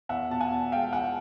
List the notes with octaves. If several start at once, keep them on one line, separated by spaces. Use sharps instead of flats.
E2 E5 F#5
B2 A5
F#5 G#5
E2
G#3 F5 G5
E2 F#5 G#5